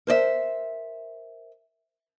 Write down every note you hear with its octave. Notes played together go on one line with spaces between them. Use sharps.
A#4 C5 D5 E5